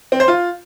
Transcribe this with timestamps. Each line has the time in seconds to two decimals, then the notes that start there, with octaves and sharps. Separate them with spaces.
0.12 C4
0.20 C5
0.28 F4